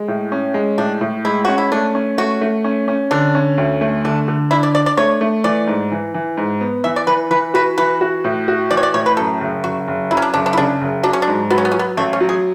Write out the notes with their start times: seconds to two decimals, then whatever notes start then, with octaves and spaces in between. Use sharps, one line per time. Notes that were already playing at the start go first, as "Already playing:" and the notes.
Already playing: G#3
0.08 A2
0.32 C#4
0.54 G#3
0.78 A2 D4
1.01 A2
1.25 G#3 E4
1.45 C#4 F#4
1.58 E4
1.72 A3 D4
1.95 C#4
2.18 A3 F#4
2.41 A3
2.64 C#4
2.88 C#4
3.11 D3 D4
3.35 C#4
3.58 D2
3.81 A3
4.05 D3 D4
4.28 D3
4.51 D4 E4
4.63 D5
4.74 D4 D5
4.86 D5
4.97 A3 C#5
5.21 A3
5.44 E3 D5
5.67 G#2
5.92 E3
6.14 E3
6.37 G#2
6.61 B3
6.84 E3 E5
6.96 D5
7.07 E3 B4
7.30 E3 B4
7.54 F#4 B4
7.78 E3 B4
8.01 F#4
8.24 A2
8.48 F#4
8.71 E3 D5
8.77 C#5
8.83 D5
8.94 A2 C#5
9.06 B4
9.17 F#2 A4
9.41 F#1
9.64 F#1 F#4
9.88 F#1
10.11 F#2 E4
10.17 C#4
10.22 D4
10.34 F#1 D4
10.46 D4
10.53 E4
10.57 C#3 D4
10.81 F#1
11.03 F#3 D4
11.13 C#4
11.22 D4
11.28 G#2
11.50 F#3 B3
11.58 C#4
11.65 B3
11.72 F#3 C#4
11.79 B3
11.97 A1 A3
12.13 C#4
12.20 F#3
12.29 G#4